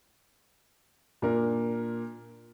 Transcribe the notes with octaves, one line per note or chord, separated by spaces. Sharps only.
A#2 D4 A#4